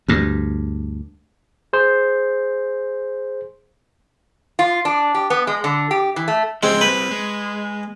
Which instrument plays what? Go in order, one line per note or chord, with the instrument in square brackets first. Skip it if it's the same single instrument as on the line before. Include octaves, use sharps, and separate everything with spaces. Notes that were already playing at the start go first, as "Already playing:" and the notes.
[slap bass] D2 G2
[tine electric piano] G#4 C5
[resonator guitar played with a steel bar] F4
D4
G4
B3
G#3
D3
G4
E3
A3
[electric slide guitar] C#3 F3 [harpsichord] G#3 C4
[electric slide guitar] G3 C4 [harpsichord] B4
[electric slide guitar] G#3